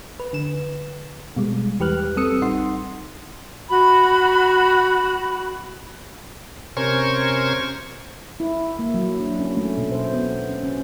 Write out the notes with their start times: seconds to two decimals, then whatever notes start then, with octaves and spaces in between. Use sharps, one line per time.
0.20 B4
0.33 D3 E7
1.36 B2 G3 G#3
1.80 E2 E3 G4 B4 F6 F#6
2.16 G3 C4 A4 D#6 E6 C#7
2.42 A1 D#4 F#5 C6
3.70 F#4 B5
6.77 C3 C#4 A#4 C5 C#6 G#6
8.40 E4
8.79 A#3
8.94 F#3
9.20 D4
9.39 C#4
9.57 A3
9.77 B2
9.92 C5
10.14 B3
10.49 C#4
10.63 C#4